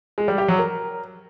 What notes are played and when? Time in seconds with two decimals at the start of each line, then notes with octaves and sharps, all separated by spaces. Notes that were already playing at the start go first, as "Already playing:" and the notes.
0.18 G#3
0.28 G3
0.38 G4
0.48 F#3
0.59 A#4